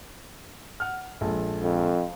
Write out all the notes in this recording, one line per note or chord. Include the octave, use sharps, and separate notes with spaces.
F#5 F6
A#1 G#3 A4
F2